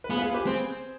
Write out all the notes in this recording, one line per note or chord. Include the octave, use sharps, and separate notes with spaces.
B4
B3 F4 G#4
B4
F4 G#4
G4 B4
C4 G#4 C5